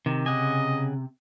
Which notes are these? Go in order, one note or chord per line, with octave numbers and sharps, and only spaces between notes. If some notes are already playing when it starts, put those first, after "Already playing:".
C3 D#3
C#3 D#5 F#5 G#5